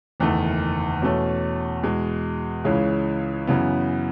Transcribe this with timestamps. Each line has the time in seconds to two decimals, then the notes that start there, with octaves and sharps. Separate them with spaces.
0.20 F#1 E2 D#3 A3
1.02 E2 B2 A3 C#4
1.83 E2 B2 G#3
2.64 C#2 C#3 E3 G#3 C#4
3.47 F#2 C#3 E3 B3